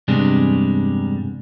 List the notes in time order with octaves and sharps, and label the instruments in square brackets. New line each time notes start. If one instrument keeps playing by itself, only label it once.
[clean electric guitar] E2 G2 C3 G3 G#3 D4